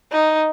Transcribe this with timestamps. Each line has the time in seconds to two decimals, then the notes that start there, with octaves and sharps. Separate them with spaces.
0.12 D#4